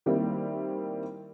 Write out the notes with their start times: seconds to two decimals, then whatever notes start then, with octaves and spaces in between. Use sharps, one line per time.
0.06 D#3 G3 A#3 C4 E4